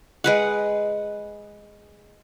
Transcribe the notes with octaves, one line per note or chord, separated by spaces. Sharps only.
G#3 B4 F#5